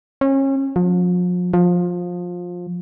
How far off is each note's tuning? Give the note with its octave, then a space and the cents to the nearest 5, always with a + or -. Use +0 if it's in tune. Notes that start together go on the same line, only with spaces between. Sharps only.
C#4 -30
F3 +40
F3 +20